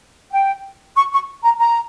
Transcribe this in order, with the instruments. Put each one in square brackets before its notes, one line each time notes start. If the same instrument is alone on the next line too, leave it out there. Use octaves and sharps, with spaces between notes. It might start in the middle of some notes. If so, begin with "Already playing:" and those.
[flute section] G5
C#6
C#6
A#5
A#5